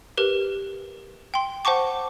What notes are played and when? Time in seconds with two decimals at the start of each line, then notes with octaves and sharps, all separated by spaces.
0.17 G4 A#4 B4
1.34 G5 C6
1.65 C5 F#5 A5 C#6 D6